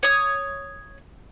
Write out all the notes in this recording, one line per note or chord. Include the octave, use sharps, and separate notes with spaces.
C#5 D#6